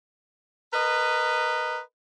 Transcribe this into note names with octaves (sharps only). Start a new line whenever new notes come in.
A#4 B4 D#5